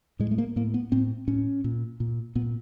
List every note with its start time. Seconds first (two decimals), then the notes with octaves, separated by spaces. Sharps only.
0.19 A2 G#3
0.31 A3
0.38 A#3
0.56 A2 A#3
0.74 B3
0.92 A2 C4
1.28 A2 C#4
1.64 A#2
2.00 A#2
2.35 A#2 B3